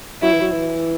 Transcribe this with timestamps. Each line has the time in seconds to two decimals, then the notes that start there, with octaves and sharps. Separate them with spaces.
0.22 F#3 E4
0.33 E3
0.42 F#3
0.52 E3